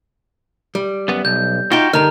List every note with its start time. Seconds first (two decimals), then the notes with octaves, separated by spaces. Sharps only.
0.75 G3
1.08 F#2 B3
1.25 B1 G6
1.71 D#4 F4 F#4 G5
1.93 G2 D3 D#3 A#5 F6